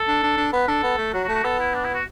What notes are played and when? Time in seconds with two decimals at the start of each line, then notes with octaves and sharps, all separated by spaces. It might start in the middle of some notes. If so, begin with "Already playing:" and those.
Already playing: A4
0.08 D4
0.23 D4
0.37 D4
0.53 B3 B4
0.68 D4 A4
0.83 B3
0.98 A3
1.13 F#3 F#4
1.24 F#4
1.29 A3
1.35 F#4
1.44 B3 A4
1.60 E4
1.74 D4
1.85 E4
1.94 F#4